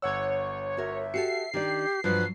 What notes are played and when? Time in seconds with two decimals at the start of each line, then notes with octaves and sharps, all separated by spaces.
0.02 G1 C#5 F#5 E6
0.77 F#4 A#4 E5
1.14 F#4 G4 A4 C7 C#7
1.53 D#3 D4 G4 D5
2.04 G2 F3 F#3 B4